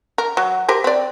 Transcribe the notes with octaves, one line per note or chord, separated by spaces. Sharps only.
A#4
F#3
G4 A#4 C5
C4 D5